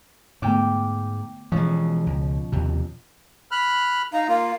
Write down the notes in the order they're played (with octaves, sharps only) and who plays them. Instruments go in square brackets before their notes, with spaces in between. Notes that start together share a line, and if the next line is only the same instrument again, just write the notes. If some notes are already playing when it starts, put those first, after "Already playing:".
[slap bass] G#2 [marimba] D3 A3 B3 [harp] G5 D6
[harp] B2 F3 C#4 [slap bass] E3 G#3
[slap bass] C#2
D#2 C3
[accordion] B5 F6 F#6
[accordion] D#4 A#5 [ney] F5
[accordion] A#3 F4 [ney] F5